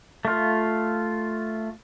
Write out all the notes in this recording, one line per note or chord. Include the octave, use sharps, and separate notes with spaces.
A3 F4